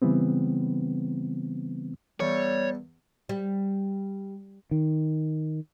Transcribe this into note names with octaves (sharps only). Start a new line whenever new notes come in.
C#3 E3 G3 B3 C4
E2 G3 C#5
G3
D#3